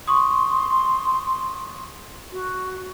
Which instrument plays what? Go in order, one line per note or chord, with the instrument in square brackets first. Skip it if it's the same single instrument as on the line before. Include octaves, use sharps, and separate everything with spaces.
[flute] C6 [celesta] C#6 D#6
[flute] F#4